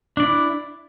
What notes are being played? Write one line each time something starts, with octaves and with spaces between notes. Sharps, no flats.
D4 E4 D5